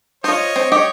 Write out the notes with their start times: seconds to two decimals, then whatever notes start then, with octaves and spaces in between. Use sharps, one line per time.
0.24 F4 C5 C#5 D#5
0.56 C4
0.72 G4 C#5 D#5 G5